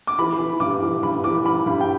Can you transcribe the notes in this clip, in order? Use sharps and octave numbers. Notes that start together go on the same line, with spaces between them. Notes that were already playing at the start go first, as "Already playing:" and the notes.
D6
E3 B5
E3
G2 D6
E3
G2 B5
E3 D6
E3 B5
G2 B5
G5